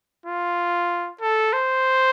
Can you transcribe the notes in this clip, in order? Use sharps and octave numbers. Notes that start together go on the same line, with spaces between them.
F4
A4
C5